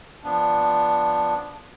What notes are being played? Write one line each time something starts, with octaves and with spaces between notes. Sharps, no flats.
F3 B3 D4